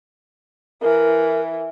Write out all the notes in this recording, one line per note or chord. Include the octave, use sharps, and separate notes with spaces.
E3 A#4